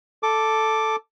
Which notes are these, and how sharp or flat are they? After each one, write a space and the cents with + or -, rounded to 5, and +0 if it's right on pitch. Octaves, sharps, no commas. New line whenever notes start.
A4 +0 D6 +0